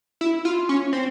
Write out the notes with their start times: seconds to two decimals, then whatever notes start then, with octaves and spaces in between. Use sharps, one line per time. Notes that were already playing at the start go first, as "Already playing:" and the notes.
0.21 E4
0.45 F4
0.69 C#4
0.93 C4